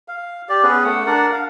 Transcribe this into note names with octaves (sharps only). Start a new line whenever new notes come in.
F5
G4 D5
B3 C#4 G#4 B4
A3 F#5
D4 A#4 D5 F#5
F5